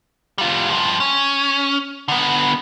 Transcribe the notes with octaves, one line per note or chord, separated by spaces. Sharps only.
G3 F4
G2 F3
C#4
D3 B3